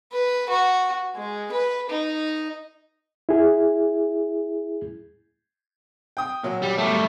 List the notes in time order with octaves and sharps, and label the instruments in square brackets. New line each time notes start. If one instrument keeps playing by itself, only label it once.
[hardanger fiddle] B4
F#4
G#3
B4
D#4
[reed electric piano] E4 G#4
[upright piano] G5 D#6
A#2 F#3
[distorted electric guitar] G3
G3 A3